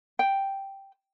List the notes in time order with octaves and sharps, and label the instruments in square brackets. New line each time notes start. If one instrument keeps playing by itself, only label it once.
[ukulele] G5